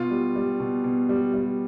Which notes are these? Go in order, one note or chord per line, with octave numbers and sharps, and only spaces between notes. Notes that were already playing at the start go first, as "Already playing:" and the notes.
Already playing: B2 F4
G3
G3
B2
B2
G3
G3